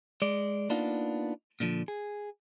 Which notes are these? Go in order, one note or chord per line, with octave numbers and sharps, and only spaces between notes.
G#3 D5
A#3 B3 D4 D#4 F4
A#2 D3 F3
G#4